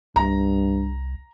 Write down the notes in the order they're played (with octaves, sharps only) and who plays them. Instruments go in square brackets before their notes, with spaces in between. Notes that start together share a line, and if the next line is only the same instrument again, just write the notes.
[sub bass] C2 [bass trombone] G2 [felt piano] A#5